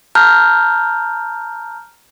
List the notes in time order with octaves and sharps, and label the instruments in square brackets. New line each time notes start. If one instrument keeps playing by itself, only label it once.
[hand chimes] A5 A#5 F6 G6